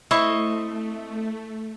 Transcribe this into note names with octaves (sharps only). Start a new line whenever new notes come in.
A3 C4 E4 D#5 C#6